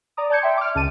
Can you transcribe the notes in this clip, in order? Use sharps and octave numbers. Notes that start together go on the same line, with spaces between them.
D5 A#5 D#6
D5 A5 G6 G#6 C#7
D5 E5 G5 C6
D6 F6
C#2 A5 D#7